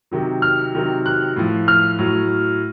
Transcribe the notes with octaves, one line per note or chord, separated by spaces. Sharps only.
C3 D#3 F#3
F6
C3 D#3 F#3
F#6
A2 F3
F6
A2 F#3